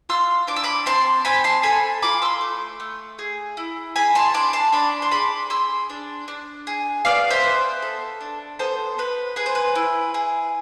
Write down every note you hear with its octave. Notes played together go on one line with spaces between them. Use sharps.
F4 C6 E6
D4 D6
E6
B5 D6
C4 A5 C6
C4 G#5 B5
A5 C6
A4 G#5 B5
F4 B5 D6
C6 E6
A3
A3
G#4
E4
G#4 G#5 B5
A5 C6
D4 B5 D6
A5 C6
D4 B5 D6
C6
G#4 B5 D6
G#4 C6 E6
D4
D4
G#4
B3 D5 F5
C5 E5
B3
A4
D4
B3 A4 C5
B3 B4
G#4 B4
C5
B4
E4
G#4